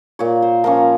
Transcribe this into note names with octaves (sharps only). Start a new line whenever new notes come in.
A#2 C#5
C5
F3 A#3 C#4 A#4